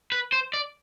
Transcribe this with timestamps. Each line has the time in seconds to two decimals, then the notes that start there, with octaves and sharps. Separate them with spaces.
0.12 B4
0.32 C5
0.54 D5